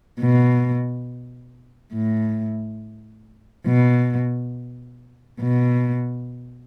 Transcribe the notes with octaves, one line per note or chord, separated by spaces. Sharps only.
B2
A2
B2
B2